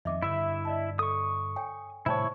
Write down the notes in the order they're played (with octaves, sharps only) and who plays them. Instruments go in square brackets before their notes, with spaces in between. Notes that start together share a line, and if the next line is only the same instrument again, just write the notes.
[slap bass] F2 D#3 [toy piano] D#5 E5 D6
[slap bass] G2 D3 [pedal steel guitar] E4 E5 [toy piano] C#5
[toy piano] D5 D#5 A5
[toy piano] A4 [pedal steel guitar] C#6 D#6
[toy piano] C#5 G5 G#5
[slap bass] A2 C3 D#3 [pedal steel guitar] E4 C#5 [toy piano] C5 G5 A5